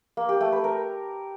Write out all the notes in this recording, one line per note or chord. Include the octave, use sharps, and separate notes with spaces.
A#3
G4
A3
B4
A#4